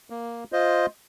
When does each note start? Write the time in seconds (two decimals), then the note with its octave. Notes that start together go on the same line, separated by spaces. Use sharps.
0.10 A#3
0.52 F4 C5 D#5